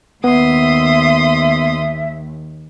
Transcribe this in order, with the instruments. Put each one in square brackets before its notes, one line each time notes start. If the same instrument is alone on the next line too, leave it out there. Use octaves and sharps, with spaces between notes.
[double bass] D#2 [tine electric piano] B3 [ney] E5 [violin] C6 D#6